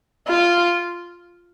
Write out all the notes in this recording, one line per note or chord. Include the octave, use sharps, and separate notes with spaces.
F4